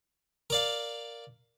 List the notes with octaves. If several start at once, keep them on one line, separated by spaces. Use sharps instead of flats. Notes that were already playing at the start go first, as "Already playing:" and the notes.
A#4 D5 F5